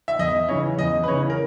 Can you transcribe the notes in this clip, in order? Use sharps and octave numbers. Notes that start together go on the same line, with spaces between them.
E5
E2 D#5
C#3 E3 C#5
E2 D#5
B4
C#3 E3 C#5
A#4